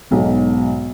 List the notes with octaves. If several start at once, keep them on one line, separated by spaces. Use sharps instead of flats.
B1 G#2 B2